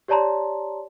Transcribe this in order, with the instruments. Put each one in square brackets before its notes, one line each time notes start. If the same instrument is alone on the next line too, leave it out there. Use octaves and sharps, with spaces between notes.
[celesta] G4 C#5 D5 A5 A#5 C6